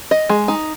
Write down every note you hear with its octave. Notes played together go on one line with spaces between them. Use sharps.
D#5
G#3
D#4